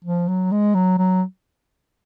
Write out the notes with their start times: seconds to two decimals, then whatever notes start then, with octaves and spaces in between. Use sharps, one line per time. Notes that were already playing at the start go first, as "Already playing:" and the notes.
0.05 F3
0.28 F#3
0.52 G#3
0.75 F#3
0.98 F#3